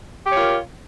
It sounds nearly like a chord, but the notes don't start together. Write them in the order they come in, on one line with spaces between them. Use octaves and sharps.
G4 C#5 F4 A#4